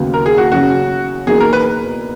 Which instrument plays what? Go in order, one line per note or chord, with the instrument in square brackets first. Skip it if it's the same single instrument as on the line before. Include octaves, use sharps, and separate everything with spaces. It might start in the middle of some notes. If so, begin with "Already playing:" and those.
Already playing: [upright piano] D#2 C#3 F#3 B3
[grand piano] A#4
G#4
F#4
[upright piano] F#2 C#3 F#3 C#4 [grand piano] F#4
[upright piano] E2 B2 F#3 A#3 D#4 [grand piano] G#4
[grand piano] A#4
B4